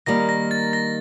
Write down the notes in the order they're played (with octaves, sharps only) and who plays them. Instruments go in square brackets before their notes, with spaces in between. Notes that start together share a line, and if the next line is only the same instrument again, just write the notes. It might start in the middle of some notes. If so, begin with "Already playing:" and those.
[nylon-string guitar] D#3 G3 A#3 [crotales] A#6
[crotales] A#6
A6
A#6